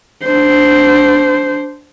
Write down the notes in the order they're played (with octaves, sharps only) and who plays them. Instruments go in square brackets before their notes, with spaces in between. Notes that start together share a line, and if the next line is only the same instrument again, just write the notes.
[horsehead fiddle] D4 C5